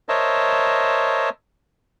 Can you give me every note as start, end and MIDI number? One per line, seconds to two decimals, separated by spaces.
0.09 1.29 70
0.09 1.29 72
0.09 1.29 73
0.09 1.29 75
0.09 1.29 76
0.09 1.29 81